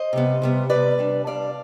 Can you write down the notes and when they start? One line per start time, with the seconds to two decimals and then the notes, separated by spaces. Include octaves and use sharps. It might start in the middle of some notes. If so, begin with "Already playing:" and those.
Already playing: C5 D#5
0.13 C3 G3 B3
0.42 C3 G3 B3
0.70 C3 G3 B3 B4 D5
0.98 C3 G3 D4
1.26 C3 G3 D4 D5 F5